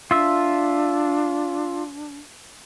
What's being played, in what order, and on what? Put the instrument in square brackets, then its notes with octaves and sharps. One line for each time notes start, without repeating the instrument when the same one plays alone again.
[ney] D4 [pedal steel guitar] F4 E5